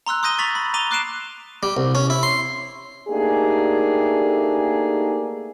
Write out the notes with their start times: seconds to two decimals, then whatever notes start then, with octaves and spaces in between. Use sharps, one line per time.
0.06 A#5 C6 E6 F#6
0.23 C6 D#6 G6 A#6 D#7 G7
0.38 C#6 A6 B6 F7 F#7
0.55 B5
0.74 A#5 D6 D#7 F7 G7
0.91 D6 F#6 C7 D7 E7
1.63 G3
1.77 C2
1.95 C#4
2.10 E4
2.23 C6
3.08 A3 A#3 D4 D#4 G4 G#4